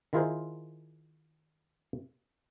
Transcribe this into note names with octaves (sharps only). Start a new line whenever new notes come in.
D#3 E4 F4 G#4 A#4 C5